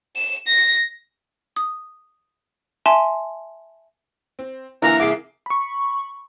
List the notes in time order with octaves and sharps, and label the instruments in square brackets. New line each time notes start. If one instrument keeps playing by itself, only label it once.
[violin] E7
A#6
[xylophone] D#6
E5 G#5 A5 C6 E7
[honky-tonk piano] C4
[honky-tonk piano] D3 F4 [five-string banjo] E3 A#3 E4 [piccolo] A#5
[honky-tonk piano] C2 G#4 C7 [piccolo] D6
[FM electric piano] B5 C#6